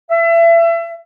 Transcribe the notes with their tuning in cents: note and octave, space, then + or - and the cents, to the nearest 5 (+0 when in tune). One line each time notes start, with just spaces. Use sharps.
E5 +30